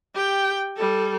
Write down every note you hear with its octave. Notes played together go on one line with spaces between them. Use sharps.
G4 G5
G3 A4